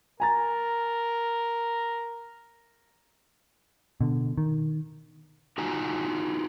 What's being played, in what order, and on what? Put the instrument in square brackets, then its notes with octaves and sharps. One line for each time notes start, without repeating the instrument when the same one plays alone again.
[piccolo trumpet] A#4 [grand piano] G#5 A#5 A6
[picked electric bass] B2 D3
D#3
[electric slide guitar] D#4 F4 F#4 G#5 A#5